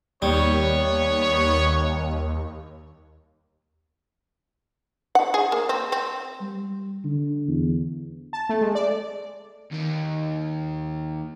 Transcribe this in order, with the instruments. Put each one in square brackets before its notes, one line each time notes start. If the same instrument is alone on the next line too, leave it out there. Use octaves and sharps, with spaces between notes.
[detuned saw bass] D#2 [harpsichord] G3 [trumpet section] B3 C#5
[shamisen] F#5
G#4
A#3
C4
C4
[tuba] G3
D3
E2
[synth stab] A5
A3
G#3
D5
[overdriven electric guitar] D#2 D#3